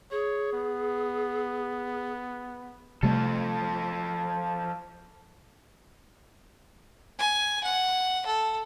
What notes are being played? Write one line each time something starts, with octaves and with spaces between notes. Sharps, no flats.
G#4 C#5
B3
C3 F3 G3 A3 A4
G#5
F#5
A4